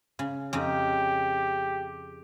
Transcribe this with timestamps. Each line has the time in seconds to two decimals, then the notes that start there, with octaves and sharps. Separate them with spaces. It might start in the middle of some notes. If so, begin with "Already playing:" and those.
0.19 C#3
0.53 F2 C#3 D#4 G4